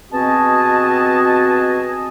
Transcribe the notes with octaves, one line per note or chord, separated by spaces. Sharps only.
B2 C4 F#4 G#4 D#5 A5